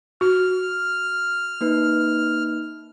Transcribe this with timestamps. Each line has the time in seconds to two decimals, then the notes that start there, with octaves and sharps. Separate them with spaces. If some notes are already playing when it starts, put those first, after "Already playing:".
0.21 F#4 F6
1.61 A#3 D#4 B4